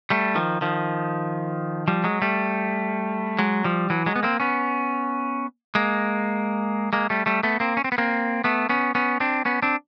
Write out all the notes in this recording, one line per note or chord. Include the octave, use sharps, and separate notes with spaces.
G3 A3
D#3 F3
D#3 F3
F3 G3
F#3 G#3
G3 A3
F#3 G#3
F3 G3
E3 F#3
F#3 G#3
B3
A#3 C4
B3 C#4
G#3 A#3
G#3 A#3
G3 A3
G3 A3
A3 B3
A#3 C4
C#4
C4
B3
A#3 C4
A3 B3
B3 C#4
B3 C#4
C4 D4
B3 C#4
C4 D4